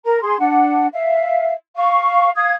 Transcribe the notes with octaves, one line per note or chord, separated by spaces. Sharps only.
A#4 A#5
G#4 C6
D4 F#5
E5 F5
F5 C#6
F5 D#6 G#6